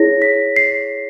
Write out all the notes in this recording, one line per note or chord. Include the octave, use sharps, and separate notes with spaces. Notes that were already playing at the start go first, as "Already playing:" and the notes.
Already playing: E4 G#4 C#5 A#6
B6
C7